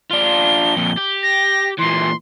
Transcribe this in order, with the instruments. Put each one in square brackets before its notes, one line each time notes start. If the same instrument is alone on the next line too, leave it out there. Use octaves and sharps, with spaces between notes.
[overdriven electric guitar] D4 F4 [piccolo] G7
[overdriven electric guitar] F2 A#2
G4
[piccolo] A#6
[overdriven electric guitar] A#2 E3 [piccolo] C6